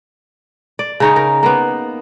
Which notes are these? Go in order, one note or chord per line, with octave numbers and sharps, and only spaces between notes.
D5
C#3 D#4 C#5
A#4
A#3 B3